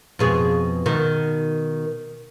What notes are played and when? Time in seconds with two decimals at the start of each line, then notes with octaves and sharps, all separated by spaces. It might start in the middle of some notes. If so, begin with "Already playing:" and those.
0.19 F2 B2 G#4
0.86 B2 D#3